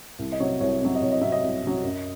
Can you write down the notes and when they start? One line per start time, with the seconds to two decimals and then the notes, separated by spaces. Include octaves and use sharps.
0.19 C2
0.32 D#5
0.40 C3 F#3 C#5
0.60 C2 C#5
0.81 C3 F#3
0.95 D#5
1.01 C2 C#5
1.12 D#5
1.21 C3 F#3 E5
1.32 D#5
1.43 C2
1.63 C3 F#3
1.83 F#2